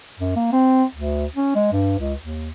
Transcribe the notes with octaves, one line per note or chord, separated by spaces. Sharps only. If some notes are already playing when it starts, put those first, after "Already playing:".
F#2
A#3
C4
D2
C#4
G#3
G2
C#2
D#2